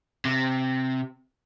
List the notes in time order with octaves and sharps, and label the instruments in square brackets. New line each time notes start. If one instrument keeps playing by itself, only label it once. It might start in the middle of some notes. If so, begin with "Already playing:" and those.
[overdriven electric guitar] C3